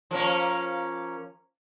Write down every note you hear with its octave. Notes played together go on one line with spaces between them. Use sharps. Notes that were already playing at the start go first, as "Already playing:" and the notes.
F3 A#3 C#4